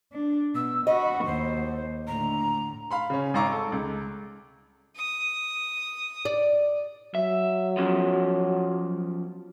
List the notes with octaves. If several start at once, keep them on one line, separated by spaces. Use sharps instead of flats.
D4
B2 E6
F#4 D#5 B5
D#2 C5
A2 D3 A#5
F5 B5 C6
C#3 C#4
G#1 F5 A#5 C#6 D6
A4
C#2
D#6
D5
F#3 E5
F3 C#4